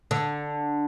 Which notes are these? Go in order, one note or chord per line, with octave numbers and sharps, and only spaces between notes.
D3